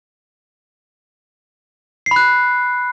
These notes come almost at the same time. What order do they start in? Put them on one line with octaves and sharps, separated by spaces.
C7 B5 F#6